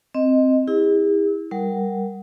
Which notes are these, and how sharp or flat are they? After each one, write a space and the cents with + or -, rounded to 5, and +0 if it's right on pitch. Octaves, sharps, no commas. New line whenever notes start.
C4 +0 D#5 +0
E4 -25 G#4 -45
G3 +0 A#4 +0 F#5 +0